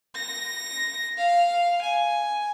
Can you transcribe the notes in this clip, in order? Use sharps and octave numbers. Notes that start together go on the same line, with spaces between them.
A#6
F5
G#5